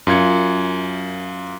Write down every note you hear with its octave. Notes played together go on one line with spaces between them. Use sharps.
F#2 F4 G#6 C#7